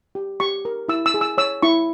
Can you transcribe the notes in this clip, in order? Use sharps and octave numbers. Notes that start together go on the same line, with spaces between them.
G4
G4 C#6
A#4
E4 E6
E6
G#4
E6
C#5 E6
E4 C#6